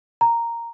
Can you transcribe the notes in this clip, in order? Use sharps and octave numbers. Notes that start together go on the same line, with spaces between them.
A#5